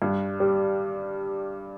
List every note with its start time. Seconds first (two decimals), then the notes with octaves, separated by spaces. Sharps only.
0.02 G2
0.40 G3